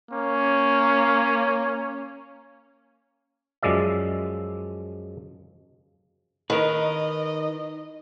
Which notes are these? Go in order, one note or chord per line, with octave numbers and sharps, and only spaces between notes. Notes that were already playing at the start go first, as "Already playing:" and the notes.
A#3 C#4
F#2 F3 G#3 D5 E5
D#3 A#4 B4 D#5